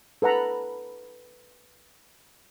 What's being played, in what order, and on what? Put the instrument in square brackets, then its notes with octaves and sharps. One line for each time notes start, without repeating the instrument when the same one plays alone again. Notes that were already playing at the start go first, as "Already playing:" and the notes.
[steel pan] A4 B4 F#5 A#5 B5